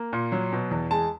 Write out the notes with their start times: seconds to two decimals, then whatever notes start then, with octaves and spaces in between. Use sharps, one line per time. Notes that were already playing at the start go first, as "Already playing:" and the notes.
Already playing: A#3
0.13 A#2
0.32 F#3
0.53 B2
0.71 E2
0.91 G#3 A5